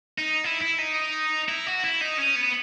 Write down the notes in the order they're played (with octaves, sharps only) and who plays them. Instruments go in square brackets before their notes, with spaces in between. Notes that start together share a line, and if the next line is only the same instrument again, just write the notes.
[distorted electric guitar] D#4
E4
E4
D#4
E4
F#4
E4
D#4
C#4
B3